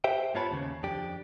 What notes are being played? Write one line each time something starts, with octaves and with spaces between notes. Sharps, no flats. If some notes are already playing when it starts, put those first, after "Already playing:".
G4 C5 E5 G5
G#2 B3 F4 C#5 A5 B5
D#2 C#3
F2 D4 G4